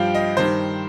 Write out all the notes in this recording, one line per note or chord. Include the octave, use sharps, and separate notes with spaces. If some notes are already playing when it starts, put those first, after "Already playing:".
Already playing: G2 F3 F5 G5
D#5
G2 D#3 C5